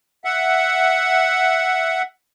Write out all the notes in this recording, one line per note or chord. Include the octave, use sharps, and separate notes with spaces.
E5 F#5